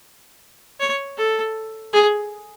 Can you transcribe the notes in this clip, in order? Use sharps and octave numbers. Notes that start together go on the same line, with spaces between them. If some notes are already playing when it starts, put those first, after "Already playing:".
C#5
A4
G#4